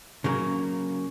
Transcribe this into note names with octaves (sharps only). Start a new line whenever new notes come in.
C#3 F#3 A#3